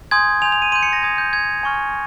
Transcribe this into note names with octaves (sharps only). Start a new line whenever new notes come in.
G#5 C6 D#6 G6 G#6
G#5 C6 G6 F7
F7
D#7
C6 G6 D#7
C#7
A#6
G#5 C6 D#6 G6 G#6
G6
C6 G6 G#6
G#5 C#6 F6